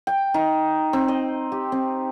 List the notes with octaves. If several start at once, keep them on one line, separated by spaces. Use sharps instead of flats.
G5
D#4
C4
D#5
G4
C4